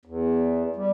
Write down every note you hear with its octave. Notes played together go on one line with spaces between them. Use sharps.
E2
G3